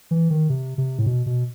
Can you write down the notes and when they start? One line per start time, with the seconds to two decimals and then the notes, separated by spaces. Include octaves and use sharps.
0.11 E3
0.30 D#3
0.49 C3
0.78 C3
0.99 A2
1.06 B2
1.26 B2